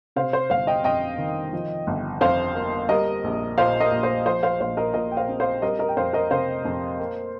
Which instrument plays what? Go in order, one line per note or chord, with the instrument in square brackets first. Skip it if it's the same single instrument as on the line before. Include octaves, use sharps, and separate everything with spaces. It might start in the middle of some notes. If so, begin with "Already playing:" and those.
[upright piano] C3 C5 F5
C5
G1 C5 F5
D#5 G5
F2 D#5 G5
D#3
F3
G1
F2 C5 F5
A#3
G3 A#4 D#5
A#1
A#2 C5 F5
A#4 D#5
A#1
C5
F3 C5
C5 F5
A#1 C5 F5
A#4 D#5
A#2 A#4 D#5
G5
C5 F5
C4
C5 F5
G3 A#4 D#5
A#4 D#5
G5
F2 C5 F5
A#4 D#5
C3 C5 F5
F2
A#3